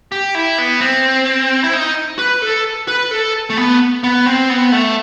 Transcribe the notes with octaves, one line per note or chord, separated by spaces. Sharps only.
G4
E4
B3
C4
E4
D#4
B4
A4
B4
A4
A3
B3
B3
C4
B3
A3